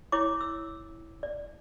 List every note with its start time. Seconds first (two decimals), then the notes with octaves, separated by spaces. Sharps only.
0.12 E4 C#5 D6
0.41 E6
1.23 D5